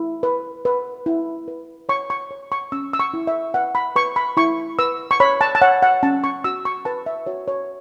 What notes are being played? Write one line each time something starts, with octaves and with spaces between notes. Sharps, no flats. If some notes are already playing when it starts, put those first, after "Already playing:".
Already playing: E4
B4
B4
E4
B4
C#5 C#6
C#6
C#5
C#6
C#4 E6
E6
C#6
E4
E5
B4 F#5
B5
B4 C#6
B5
E4 C#6
B4 E6
C#6
C#5 B5
A5
A5
C#5 F#5
F#5
C#4 A5
C#6
F#4 E6
C#6
B4 A5
E5
F#4 C#5
C#5